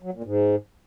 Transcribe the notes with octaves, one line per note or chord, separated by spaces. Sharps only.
F#3
A#2
G#2